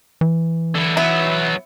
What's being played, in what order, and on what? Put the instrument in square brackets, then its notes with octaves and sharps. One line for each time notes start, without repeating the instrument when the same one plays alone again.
[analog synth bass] E3
[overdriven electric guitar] D3 E4
[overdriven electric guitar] F#3 B3 [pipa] E4